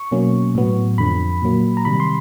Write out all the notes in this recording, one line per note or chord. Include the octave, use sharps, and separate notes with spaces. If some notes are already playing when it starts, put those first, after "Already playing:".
Already playing: C#6
B2 F#3 A#3 C#4
A2 F#3 B3
F2 D3 F3 B5
A#2 F#3 A#3
A#5
C3 D#3 G3 B5
C6